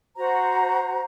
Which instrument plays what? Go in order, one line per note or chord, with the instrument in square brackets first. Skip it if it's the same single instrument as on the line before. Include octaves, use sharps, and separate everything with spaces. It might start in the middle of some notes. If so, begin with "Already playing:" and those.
[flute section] F#4 C5 A#5